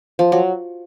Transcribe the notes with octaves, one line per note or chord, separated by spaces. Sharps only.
F3
F#3